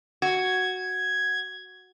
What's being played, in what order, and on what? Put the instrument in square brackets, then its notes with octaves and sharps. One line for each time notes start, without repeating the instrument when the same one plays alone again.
[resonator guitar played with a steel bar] F#4 [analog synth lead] G#6